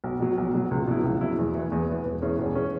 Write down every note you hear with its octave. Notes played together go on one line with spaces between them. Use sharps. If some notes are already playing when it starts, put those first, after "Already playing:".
B1
B2 F#3
B1
B2 F#3
C#2
B2 F#3 E4
C#2
B2 F#3 E4
E2
E3 B3
E2
E3 B3
E1
E2 E3 C#4 G#4
E1
E3 C#4 G#4